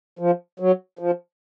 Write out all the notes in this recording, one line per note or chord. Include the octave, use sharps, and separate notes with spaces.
F3
F#3
F3